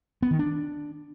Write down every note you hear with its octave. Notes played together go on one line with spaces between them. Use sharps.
B3
D#3
D4